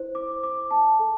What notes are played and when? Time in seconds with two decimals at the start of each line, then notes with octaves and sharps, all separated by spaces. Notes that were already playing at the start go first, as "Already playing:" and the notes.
Already playing: E4 C5
0.15 D6
0.43 D6
0.71 A5
0.99 A4